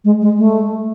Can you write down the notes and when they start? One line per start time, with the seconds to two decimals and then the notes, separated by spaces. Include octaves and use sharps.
0.05 G#3
0.22 G#3
0.38 A3